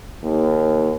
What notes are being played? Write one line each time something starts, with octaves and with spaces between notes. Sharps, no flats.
D#2